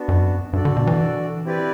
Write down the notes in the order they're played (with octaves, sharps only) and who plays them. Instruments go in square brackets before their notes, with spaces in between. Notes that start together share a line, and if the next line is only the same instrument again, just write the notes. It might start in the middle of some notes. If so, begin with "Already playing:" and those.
Already playing: [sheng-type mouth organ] B3 D4 F#4
[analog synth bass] F#2
[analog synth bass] G2 [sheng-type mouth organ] D4 F#4 A4 D5
[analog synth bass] D3
B2
E3
[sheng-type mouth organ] C4 E4 G4 B4 D5